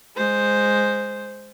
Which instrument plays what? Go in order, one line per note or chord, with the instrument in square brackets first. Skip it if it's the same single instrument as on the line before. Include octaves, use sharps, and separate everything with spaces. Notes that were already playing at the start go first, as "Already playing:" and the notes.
[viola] G#3 C5